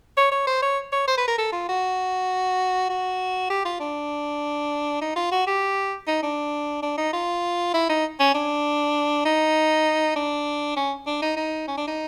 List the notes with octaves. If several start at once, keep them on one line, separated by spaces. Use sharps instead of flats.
C#5
C#5
C5
C#5
C#5
C5
B4
A#4
A4
F4
F#4
F#4
G4
F4
D4
D#4
F4
F#4
G4
D#4
D4
D4
D#4
F4
E4
D#4
C#4
D4
D#4
D4
C#4
D4
D#4
D#4
C#4
D4
D#4